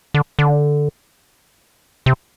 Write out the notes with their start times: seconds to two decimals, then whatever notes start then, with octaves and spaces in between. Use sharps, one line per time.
0.14 D3
0.39 D3
2.06 C3